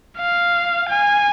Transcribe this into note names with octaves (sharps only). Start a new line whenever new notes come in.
F5
G#5